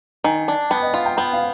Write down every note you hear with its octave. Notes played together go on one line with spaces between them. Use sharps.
D#3 G#5
D4
B3 G5
D#5
F4 F5
G5
B3 G5
F5